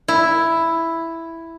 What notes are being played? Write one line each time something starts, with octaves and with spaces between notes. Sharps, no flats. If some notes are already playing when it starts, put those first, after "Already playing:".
E4